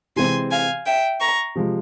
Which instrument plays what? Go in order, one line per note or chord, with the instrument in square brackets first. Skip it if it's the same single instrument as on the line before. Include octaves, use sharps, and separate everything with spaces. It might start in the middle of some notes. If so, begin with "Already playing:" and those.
[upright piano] C3 E3 G#3 C4 G4 [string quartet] G#5 C6
[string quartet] F5 G#5
E5 G5
A#5 C#6
[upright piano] C3 F3 G#3